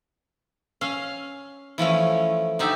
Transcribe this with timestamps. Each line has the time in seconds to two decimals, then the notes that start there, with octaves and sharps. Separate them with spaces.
0.81 C#4 F5
1.78 E3 F3 A3 C#4
2.59 D3 D#4 G4 E5